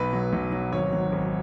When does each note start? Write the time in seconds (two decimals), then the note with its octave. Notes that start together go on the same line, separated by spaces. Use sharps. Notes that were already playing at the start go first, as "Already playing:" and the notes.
Already playing: B1 B4
0.13 F#3
0.33 B1
0.52 F#3
0.72 G#1 C#5
0.93 F#3
1.12 G#1